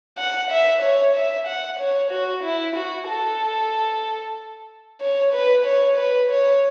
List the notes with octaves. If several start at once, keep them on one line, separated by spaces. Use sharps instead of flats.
F#5
E5
C#5
E5
F#5
C#5
F#4
E4
F#4
A4
C#5
B4
C#5
B4
C#5